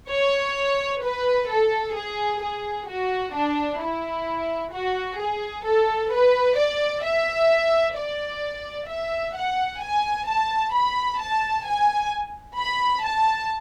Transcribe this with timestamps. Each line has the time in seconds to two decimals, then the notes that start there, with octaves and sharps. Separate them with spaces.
0.10 C#5
1.03 B4
1.50 A4
1.95 G#4
2.41 G#4
2.88 F#4
3.34 D4
3.81 E4
4.73 F#4
5.19 G#4
5.65 A4
6.12 B4
6.58 D5
7.04 E5
7.97 D5
8.89 E5
9.35 F#5
9.81 G#5
10.27 A5
10.73 B5
11.20 A5
11.66 G#5
12.58 B5
13.05 A5